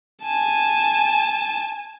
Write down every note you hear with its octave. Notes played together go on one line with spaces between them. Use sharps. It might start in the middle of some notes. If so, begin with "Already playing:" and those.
G#5 A5